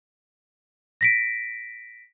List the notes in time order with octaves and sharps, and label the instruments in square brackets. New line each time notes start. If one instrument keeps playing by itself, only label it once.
[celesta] A#6 B6 D7